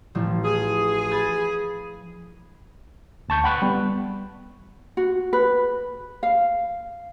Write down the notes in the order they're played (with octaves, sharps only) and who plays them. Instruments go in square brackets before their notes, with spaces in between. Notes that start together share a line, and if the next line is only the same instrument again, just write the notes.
[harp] A1 F3
[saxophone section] G#4
[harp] B5 G#6 A6
[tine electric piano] D2 A5 C#6 G6
F#5 G5 B5 C#6 F#6
G3 B3
[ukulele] F#4
B4
F5